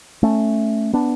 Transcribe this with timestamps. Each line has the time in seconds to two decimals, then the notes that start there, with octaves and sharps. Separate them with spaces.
0.23 A3 C#4
0.93 B3 D4